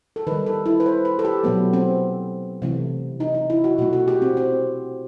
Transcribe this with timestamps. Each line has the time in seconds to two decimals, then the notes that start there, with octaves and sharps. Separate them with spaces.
0.16 A4
0.27 D#3 G3 B4
0.46 A4
0.66 E4
0.80 B4
0.86 C5
1.05 B4
1.19 A4
1.25 G4
1.44 B2 F#3 A3 B3
1.73 C4
2.62 C3 E3 A3
3.20 D#4
3.35 D#4
3.50 E4
3.64 F#4
3.78 B2 A3 F#4
3.93 F#4
4.08 G4
4.22 C4
4.37 C4